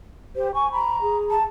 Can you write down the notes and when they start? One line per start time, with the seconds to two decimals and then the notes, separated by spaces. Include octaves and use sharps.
0.36 G4 C5
0.54 G#5 C#6
0.72 A#5 B5
1.02 G#4
1.30 A5